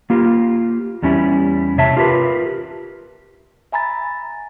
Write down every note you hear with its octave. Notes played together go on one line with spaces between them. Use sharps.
A#3 F4 G4
E2 G3 C#4 E4
C3 C#5 E5 A5
F4 G4 A#4 B4
E5 G#5 A#5 B5 A6